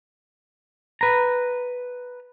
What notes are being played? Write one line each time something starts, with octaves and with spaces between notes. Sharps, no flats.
B4 A#5